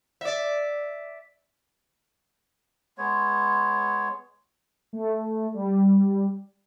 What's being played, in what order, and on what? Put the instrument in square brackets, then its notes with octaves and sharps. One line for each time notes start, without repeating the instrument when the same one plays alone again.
[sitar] D5 E5
[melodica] G#3 B3 C#5
[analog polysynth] A3
G3